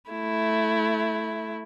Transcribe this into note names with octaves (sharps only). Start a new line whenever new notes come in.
A3 E4